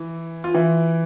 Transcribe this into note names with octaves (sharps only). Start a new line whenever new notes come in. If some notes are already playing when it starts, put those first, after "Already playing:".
Already playing: E3
F4
E3 E4